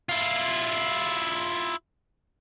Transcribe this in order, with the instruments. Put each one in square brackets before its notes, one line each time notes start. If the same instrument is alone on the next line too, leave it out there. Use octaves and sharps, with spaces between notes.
[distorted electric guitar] E4 F4